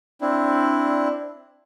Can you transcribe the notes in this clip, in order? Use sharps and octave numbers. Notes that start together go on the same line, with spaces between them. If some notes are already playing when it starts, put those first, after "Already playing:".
C4 D4 E4